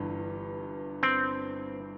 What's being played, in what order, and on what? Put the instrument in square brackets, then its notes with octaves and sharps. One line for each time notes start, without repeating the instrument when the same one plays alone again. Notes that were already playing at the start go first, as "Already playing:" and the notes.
Already playing: [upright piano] G1 G2 E3
[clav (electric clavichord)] C4